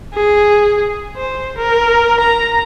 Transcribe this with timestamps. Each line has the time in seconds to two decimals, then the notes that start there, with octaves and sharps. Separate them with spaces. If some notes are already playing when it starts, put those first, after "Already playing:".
0.14 G#4
1.16 C5
1.58 A#4
2.20 A#5